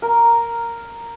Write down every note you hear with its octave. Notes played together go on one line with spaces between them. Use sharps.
A#4